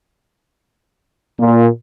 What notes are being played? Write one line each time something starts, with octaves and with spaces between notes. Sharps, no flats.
A#2